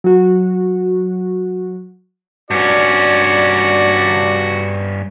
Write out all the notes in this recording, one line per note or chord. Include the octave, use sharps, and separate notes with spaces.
F#3 F#4
G2 C#4 F#4 D5